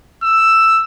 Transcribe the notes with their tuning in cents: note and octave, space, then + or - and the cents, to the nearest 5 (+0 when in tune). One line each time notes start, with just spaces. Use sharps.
E6 +5